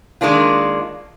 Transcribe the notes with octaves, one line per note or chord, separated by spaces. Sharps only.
D#3 G#3 A#3 D4 F4